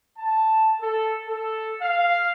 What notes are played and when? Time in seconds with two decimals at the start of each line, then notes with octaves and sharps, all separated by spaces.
0.19 A5
0.81 A4
1.28 A4
1.82 F5